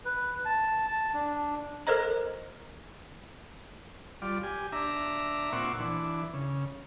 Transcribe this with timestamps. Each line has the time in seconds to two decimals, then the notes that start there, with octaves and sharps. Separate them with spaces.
0.05 B4
0.45 A5
0.88 A5
1.14 D4
1.87 A4 A#4 C5 D#5 A#5
4.22 G3 F4 D5
4.43 G4 G#5
4.72 D4 E5 A#5
5.53 A#2 C4 F#5 C#6 D6 E6
5.79 E3 D4
6.33 C#3